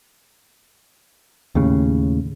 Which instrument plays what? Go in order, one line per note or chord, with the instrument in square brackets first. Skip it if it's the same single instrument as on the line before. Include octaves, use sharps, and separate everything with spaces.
[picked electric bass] D#2 A2 C#3